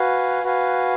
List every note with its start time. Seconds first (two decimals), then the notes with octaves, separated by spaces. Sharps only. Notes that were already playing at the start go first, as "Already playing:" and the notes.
Already playing: F#4 B4 F5 G#5
0.43 F#4 B4 F5 G#5